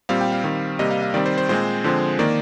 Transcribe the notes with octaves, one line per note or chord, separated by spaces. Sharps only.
A#2 G3 C4 F5
G5
F5
D#3 G3 C4
C3 G3 A#3 D#5
F5
F5
D#3 G3 C4 D5
C5
C5
A#2 G#3 C4 C5
D3 F3 G#3 C4
D#3 A#3 D5